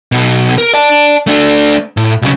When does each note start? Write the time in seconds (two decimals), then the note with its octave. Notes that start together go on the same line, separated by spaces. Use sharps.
0.12 B1 B2
0.58 A#4
0.74 D5 A5
1.27 A3 D4
1.97 A2
2.22 B1 C#3